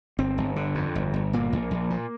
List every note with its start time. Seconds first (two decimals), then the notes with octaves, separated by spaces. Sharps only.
0.19 G1 C4
0.38 G1
0.56 D3
0.75 F2
0.95 G1
1.14 G1
1.33 A#2 A#3
1.53 A#1
1.71 A#1
1.90 A#2